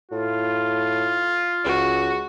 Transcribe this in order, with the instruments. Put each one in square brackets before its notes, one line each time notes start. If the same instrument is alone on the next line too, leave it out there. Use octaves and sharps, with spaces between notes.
[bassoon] A2 [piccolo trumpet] F4
[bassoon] C#2 [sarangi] F#4